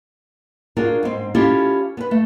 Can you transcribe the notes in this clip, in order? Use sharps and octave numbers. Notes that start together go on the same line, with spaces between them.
D4 F4 F#4 G#4 A#4
G#2 C4
C#4 E4 F4 G4 A4
B3 B4
A3